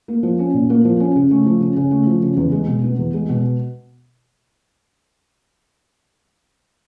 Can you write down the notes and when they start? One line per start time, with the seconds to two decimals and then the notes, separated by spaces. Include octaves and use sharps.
0.08 A#3
0.23 F3
0.39 C#4
0.54 A#2
0.70 A#3
0.85 F3
1.00 C#4
1.16 C#3
1.31 A3
1.46 F3
1.60 C#3
1.76 C#3
1.91 A3
2.07 F3
2.22 C#3
2.37 E2
2.52 G#3
2.67 B2
2.84 B3
2.99 E2
3.14 G#3
3.29 B2